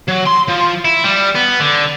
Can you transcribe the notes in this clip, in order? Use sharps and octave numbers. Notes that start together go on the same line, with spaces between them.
F#3
C6
F3
E4
G3
B3
D3